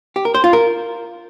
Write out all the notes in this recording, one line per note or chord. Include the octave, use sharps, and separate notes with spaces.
G4
A#4
C5
F4
A#4